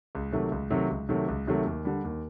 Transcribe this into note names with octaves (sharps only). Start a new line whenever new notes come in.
C#2
C3 D#3 F#3 A3
C#2
C3 D#3 F#3 A3
C#2
C3 D#3 F#3 A3
C#2
C3 D#3 F#3 A3
D#2
D3 G3
D#2